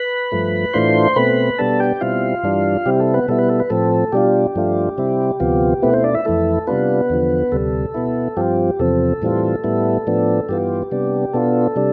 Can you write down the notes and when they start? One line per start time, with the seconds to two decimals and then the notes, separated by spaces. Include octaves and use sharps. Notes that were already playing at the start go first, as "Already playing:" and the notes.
Already playing: B4 B5
0.32 G2 F3 A3
0.74 A2 E3 A3 D4 F4 C5 C6
1.16 B2 A3 C4 B4 B5
1.58 B2 G3 B3 D4 A4 A5
1.80 G4 G5
2.01 B2 G3 C4 E4 F4 F5
2.43 G2 E3 G3 D4
2.86 C3 G3 C4 E4 G4
3.00 A4
3.14 B3 B4
3.28 B2 G3 B3 E4 A4
3.39 B4
3.49 A4
3.60 B4
3.70 A2 F3 C4 A4
4.12 B2 G3 D4 F4 G4
4.55 G2 F3 A3 D4 F4
4.98 C3 G3 C4 E4
5.40 D2 C3 F3 B3 F4
5.82 B2 A3 B3 C4 E4 B4
5.93 C4 C5
6.04 D4 D5
6.14 E4 E5
6.25 F2 E3 A3 E4 A4
6.67 C3 G3 B3 D4 F4 B4
7.10 E2 D3 F3
7.52 D2 C3 G3 A4
7.94 B2 B3 E4
8.37 G2 F3 C4 F4 G4
8.79 E2 C3 F3 C4 A4
9.22 A2 E3 G3 C4 F4
9.64 A2 G3 B3 E4
10.07 A2 F3 B3 D4
10.49 G2 E3 B3 F4 G4
10.91 C3 G3 B3 D4
11.33 B2 B3 D4 F4 A4
11.76 C3 G3 D4